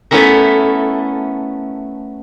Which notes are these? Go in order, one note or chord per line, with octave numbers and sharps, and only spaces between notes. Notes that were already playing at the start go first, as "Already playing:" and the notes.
A3 B3 C#4 E4 A#4